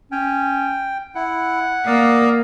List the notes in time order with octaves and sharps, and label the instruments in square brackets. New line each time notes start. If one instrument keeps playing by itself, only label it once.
[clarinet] C#4 [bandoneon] G5
[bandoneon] E4 [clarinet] F#5
[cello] A#3 [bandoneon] D5 F5 D#6